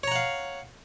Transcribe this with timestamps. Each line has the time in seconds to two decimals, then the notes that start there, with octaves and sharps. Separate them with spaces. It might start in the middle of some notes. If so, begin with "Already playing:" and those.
0.03 C#5
0.08 A#5
0.12 F#5
0.16 F5